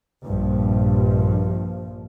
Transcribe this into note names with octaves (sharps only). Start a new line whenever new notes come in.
A#1 G2 F3